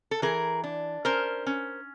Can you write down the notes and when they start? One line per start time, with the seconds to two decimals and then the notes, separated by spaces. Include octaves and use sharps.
0.11 A4
0.22 E3 G#4 A#4
0.64 D4
1.05 C#4 A#4 C5
1.47 C#4